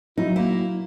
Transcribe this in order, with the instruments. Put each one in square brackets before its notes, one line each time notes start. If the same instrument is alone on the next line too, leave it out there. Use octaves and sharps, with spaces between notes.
[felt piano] F#3 [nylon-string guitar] D#4 [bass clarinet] E4
[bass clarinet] A#3 [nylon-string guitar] E4